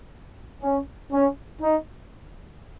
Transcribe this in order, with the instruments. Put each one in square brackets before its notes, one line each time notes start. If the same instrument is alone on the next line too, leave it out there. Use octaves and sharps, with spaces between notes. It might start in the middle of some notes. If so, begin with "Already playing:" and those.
[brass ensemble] C#4
C#4
D#4